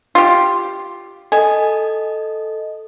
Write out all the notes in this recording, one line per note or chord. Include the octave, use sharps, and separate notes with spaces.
F4 G4
A4 D#5 G#5